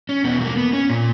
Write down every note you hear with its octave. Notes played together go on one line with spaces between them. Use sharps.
C#4
E2 B2 B3
A#3
B3
C#4
A#2 A#3